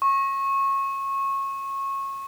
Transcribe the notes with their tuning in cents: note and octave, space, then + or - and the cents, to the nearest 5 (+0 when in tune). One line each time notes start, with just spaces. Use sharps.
C#6 -25